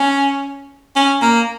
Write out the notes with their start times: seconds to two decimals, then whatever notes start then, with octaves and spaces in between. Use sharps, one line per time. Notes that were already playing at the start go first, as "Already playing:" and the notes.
Already playing: C#4
0.96 C#4
1.22 A#3